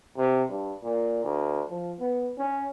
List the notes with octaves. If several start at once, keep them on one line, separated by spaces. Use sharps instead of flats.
C3
G2
A#2
D2
F3
B3
C#4